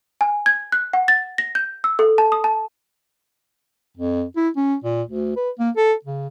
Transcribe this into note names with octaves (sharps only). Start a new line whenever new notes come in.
G#5
G#6
F#6
F#5
A6
A#6
G6
E6
A4
A5
D#6
A5
F2
E4
C#4
A#2
D2
B4
A#3
A4
C#3